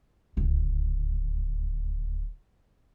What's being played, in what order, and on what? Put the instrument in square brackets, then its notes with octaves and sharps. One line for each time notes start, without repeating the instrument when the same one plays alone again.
[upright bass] D1 C#2